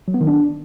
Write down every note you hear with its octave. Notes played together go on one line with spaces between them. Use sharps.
F#3
B3
D#3
D4